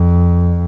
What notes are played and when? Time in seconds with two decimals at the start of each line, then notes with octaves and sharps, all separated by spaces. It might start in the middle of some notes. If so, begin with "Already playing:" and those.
Already playing: F2